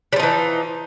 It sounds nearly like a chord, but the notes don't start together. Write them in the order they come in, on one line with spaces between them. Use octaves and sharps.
G3 F3 D#4 E3